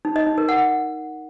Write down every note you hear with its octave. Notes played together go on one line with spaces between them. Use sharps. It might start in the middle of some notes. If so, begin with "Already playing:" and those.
D#4
D#5
D#4
A#4
F#5